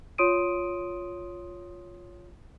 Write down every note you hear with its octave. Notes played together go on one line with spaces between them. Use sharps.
F4 C#5 C6 D#6 D7 D#7